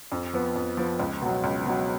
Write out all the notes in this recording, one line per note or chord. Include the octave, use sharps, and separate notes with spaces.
F2
F3 B3
F2
F3 B3
C#2
B2 F#3
C#2
B2 F#3